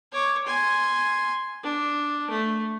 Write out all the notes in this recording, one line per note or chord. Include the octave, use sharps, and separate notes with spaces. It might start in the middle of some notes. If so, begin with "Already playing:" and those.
C#5 D6
G#5 C6
D4
A3